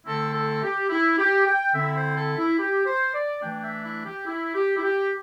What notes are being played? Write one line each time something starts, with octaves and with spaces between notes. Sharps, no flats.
D3 A3 C4 E4 A4
A4
G4
E4
G4
G5
D3 C4 E4 E5
C5
A4
E4
G4
C5
D5
E3 A3 D4 G5
E5
E4
G4
E4
G4
E4
G4